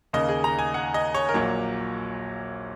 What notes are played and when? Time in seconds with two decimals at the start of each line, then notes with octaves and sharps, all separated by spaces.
0.13 D#2 C#3 A#3 D#5
0.29 G#4
0.44 A#5
0.59 G#5
0.74 F#5
0.94 D#5
1.14 C#5
1.29 A#4
1.34 A#1 A#2 F#3 A#3 C#5